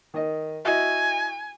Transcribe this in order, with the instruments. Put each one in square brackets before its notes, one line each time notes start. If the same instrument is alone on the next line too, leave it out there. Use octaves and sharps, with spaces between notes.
[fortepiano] D#3 D#5
[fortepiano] E4 F#4 D#5 [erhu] G#5